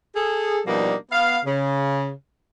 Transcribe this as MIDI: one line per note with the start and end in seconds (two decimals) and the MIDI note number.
0.15 0.59 68
0.15 0.59 69
0.66 0.94 47
0.66 0.94 53
0.66 0.94 55
0.66 0.94 58
0.66 0.94 62
0.66 0.94 63
1.11 1.39 59
1.11 1.39 77
1.45 2.10 49